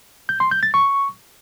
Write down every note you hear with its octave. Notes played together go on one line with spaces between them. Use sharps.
G6
C6
G6
A6
C#6